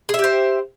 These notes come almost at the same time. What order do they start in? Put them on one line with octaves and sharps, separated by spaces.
G#4 E5 G4 C5